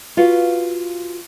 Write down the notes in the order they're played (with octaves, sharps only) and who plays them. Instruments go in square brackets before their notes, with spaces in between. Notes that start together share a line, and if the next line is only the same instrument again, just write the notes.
[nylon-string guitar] F4 F#4 B4 F5 F#5